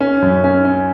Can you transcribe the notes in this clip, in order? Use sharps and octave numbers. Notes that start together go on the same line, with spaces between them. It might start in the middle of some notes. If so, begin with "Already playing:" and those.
C#4
F#2
C#4
C#4